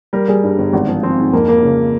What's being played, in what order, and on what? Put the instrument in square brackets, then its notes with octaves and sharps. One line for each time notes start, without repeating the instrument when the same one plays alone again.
[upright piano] G3 [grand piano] A#4
[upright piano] G3 [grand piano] G#4
[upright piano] G2
G1
G#1
F3
[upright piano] F3 [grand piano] C4
[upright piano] G#2
[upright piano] F2 [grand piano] A#3
[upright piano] F2 [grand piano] A#3
[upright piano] C#3